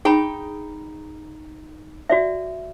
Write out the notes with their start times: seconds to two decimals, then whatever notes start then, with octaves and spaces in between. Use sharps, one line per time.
0.05 D#4 G#4 G5 B5
2.10 F#4 D5 E5